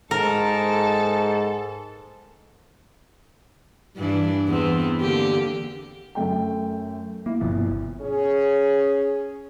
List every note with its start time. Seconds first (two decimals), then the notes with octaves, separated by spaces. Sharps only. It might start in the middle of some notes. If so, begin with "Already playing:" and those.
0.11 G#2 A4 A#4
3.97 G2 E3 D4
4.48 E2 B3 C4
5.01 D3 A#3 G4
6.15 F#2 A3 G5
7.26 A#3 E4
7.41 G1 B2 F3
8.01 C#4 G#4